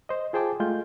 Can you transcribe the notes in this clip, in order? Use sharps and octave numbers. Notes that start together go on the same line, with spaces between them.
C5 D#5
F4 G#4 C5 G5 A5 D6
G#3 A3 F4 G6